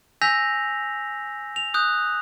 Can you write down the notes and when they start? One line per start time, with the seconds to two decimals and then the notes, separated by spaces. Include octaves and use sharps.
0.22 G#5 E6 G6 A#6 B6 F7
1.56 F7
1.74 D#6 F#6 G6